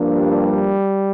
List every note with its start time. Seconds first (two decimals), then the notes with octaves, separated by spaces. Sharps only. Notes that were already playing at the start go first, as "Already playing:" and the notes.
Already playing: G2 F3 A#3 D4
0.13 G3